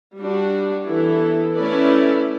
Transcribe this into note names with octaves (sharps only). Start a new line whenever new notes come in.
G3 D4 F#4
E3 B3 E4 A4
A3 C#4 E4 B4 D5